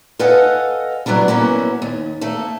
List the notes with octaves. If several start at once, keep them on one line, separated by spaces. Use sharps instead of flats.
A4 B4 D#5 F5 F#5 G#5
F#3 G3 B3 D4 E4
A#3 B3 C#4 E4
D#2
A3 A#3 A4